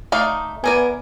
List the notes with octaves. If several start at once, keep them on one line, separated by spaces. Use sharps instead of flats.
A3 D#4 D5 F5
E3 B3 A#4 D5 G#5